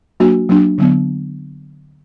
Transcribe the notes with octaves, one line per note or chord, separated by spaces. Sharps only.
F#3 A#3 D4 F#4
F#3 A#3 D4 F#4
D3 F#3 B3